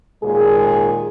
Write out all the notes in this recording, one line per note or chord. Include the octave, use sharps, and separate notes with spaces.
D#2 A#2 G#3 G#4